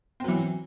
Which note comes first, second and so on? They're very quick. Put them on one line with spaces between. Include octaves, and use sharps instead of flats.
C4 F#3 E3